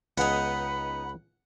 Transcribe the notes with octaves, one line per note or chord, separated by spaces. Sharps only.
C#2 B3 D#4 G#4 F#5 B5